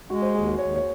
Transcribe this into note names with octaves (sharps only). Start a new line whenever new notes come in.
G#3 F#4
C5
D#2 G#4
F#4
D#2 C#5
C#5